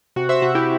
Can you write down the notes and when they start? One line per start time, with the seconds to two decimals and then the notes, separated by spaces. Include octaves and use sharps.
0.16 C3 F#4
0.29 C5 E5
0.42 C3 F#4
0.55 E4 G4